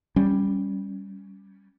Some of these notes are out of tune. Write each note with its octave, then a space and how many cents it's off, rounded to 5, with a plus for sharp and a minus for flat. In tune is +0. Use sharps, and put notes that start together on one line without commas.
G3 +0 C#4 +0